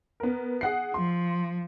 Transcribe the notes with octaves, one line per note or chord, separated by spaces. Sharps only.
B3 A#4
G#4 F#5 C7
F3 C6